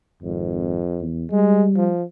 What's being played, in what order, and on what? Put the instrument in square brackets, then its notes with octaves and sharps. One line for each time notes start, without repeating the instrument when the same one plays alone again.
[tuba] G#1 [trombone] F2
[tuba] E2
[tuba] G3 [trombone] G#3
[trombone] F3